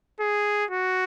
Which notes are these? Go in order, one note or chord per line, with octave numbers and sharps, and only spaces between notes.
G#4
F#4